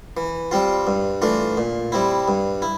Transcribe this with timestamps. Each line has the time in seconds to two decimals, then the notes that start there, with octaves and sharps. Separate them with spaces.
0.17 E3
0.51 G3 C4 F4
0.87 G2
1.22 E3 A3 D4 F4
1.57 A#2
1.92 G3 C4 E4
2.28 G2
2.62 E4